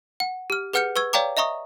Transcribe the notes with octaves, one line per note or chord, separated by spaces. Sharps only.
F#5
G4 F6
G#4 B4 F#5 F6 G6 C#7
B4 C#6 E6 G#6
C#5 D5 F5 G5 A#5 D6
D#5 E5 A#5 C#6 D#6